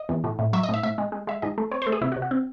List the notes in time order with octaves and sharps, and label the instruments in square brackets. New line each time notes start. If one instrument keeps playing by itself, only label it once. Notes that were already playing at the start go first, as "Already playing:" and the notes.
Already playing: [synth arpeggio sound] D#5
E2
A2
A2
F#3 E5
D#5
A2 E5
A2 E5
G#3
G#3
G#3 E5
G#2 D#5
A3
C4 C#5
A3 C5
G#4
C3 E4
F#4
C3
F#4
C4